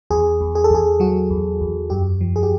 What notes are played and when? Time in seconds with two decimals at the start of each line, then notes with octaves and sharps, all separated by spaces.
0.10 E2 G#4
0.41 E2
0.55 G#4
0.64 A4
0.70 E2 G#4
1.00 F#3 F#4
1.30 E2
1.61 E2
1.90 F#2 G4
2.21 F3
2.36 G#4
2.43 G4